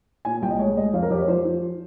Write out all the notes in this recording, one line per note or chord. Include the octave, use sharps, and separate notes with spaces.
A#2 G#5
C2 G5
D#5
G#3 C#5
G#3 D#5
F2 F5
A#4
F2 G4
C#5
F3 C5
F3